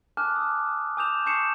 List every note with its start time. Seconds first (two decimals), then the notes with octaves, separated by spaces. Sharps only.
0.17 G#5 A5 D6 F6 F#6
0.36 D#6
0.97 G#5 D6 D#6 G6 E7 F7
1.26 A5 C#6 G6 C7 C#7 E7